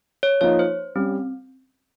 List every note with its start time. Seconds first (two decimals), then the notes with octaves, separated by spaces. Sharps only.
0.23 C#5
0.41 F3 A#3 D#4 C#5
0.59 C5
0.95 G3 C4 C#4